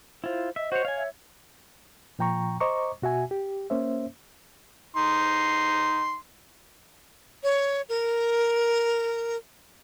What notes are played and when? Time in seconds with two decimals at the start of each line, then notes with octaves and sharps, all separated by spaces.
0.24 E4 F4 C5
0.56 D#5 E5
0.72 F#4 C5 C#5
0.85 C#5 F5 G#5
0.97 E5
2.19 A#2 F3 G5 A#5 C#6
2.60 C5 D#5 A#5 C#6 D6
3.02 B2 F#4 E5 G#5
3.31 G4
3.70 A#3 C#4 C5 E5
4.96 D#4 C6
7.44 C#5
7.89 A#4